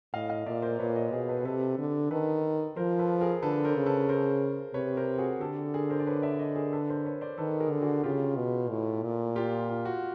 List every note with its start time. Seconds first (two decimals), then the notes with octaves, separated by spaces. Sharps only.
0.14 A2 D#5 F5
0.30 D#5 F5
0.46 A#2 D5 E5
0.62 A#4 C5
0.79 A#2 B4 C#5
0.96 C#5 D#5
1.12 B2 G#4 A#4
1.29 A4 B4
1.45 C3 A4 B4
1.78 D3
2.11 D#3 A4 B4
2.76 F3 A#4 C5
2.99 A4 B4
3.21 G#4 A#4
3.43 D3 A4 B4
3.65 A#4 C5
3.75 C#3
3.86 A4 B4
4.09 A#4 C5
4.74 C3 B4 C#5
4.97 A#4 C5
5.18 F#4 G#4
5.41 D3 G4 A4
5.73 G#4 A#4
5.90 A#4 C5
6.00 D5
6.07 B4 C#5
6.22 D5 E5
6.39 C#5 D#5
6.56 G#4 A#4
6.72 A4 B4
6.89 A#4 C5
7.05 B4 C#5
7.21 C5 D5
7.38 D#3 A4 B4
7.60 G#4 A#4
7.71 D3
7.82 F#4 G#4
8.04 C#3 F4 G4
8.37 B2
8.70 A2
9.03 A#2
9.36 F4 G4
9.69 F4
9.85 F#4